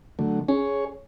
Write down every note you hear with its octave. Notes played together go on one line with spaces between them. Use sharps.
D3 F#3 A3
C#4 G#4 C#5